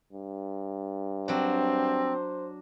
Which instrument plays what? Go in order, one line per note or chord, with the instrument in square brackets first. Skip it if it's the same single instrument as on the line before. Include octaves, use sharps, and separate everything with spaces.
[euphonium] G2
[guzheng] F#3 D4 [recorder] C4 [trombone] C5